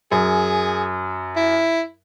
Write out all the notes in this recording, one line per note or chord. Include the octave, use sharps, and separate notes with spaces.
F#2 G#4
E4